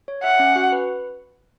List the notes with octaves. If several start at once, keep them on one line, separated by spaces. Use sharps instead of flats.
C#5
E5 F#5
C#4
F#4
B4